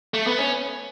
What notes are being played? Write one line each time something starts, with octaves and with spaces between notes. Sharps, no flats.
A3
B3
C#4